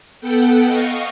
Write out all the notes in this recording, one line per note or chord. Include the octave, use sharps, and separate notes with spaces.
B3 A4 F#5 G5
D#5 F5 C#6